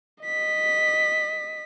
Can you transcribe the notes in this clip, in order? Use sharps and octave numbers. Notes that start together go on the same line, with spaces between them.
D#5 B6